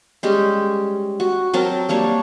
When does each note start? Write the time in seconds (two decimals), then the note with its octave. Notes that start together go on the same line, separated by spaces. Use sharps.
0.23 G3 G#3 C#4 G4
1.20 F#4
1.53 F#3 C4 A#4 A5
1.89 G3 A#3 D4 C#5